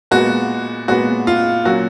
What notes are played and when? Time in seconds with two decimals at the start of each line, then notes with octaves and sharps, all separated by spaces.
0.11 A#2 G#3 B3 F#4
0.88 A#2 G#3 B3 F#4
1.27 F4
1.65 A#2 F#3 C#4 F#4